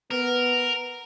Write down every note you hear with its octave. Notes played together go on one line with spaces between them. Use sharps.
B3 A#4